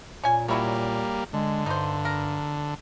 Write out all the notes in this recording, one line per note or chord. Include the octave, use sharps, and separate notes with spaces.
A#2 C#4 G#5
F#3 G3 A#3 E4 C#5
D3 G#3
G2 D#4 C5
A#4